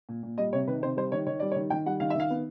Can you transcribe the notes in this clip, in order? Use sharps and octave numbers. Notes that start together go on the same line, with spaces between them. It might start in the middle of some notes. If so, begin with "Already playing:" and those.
A#2
A#2
G3 D#5
C3 C#5
D#3 B4
C3 C5
G3 C5
D#3 C#5
D#3 C#5
G3 D5
C#5
D#3
D#3 G5
G3 F#5
D#3 F5
E5
D#3 F5
B3